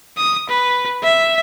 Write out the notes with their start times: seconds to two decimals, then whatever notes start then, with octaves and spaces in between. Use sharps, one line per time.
0.17 D#6
0.49 B4
1.04 E5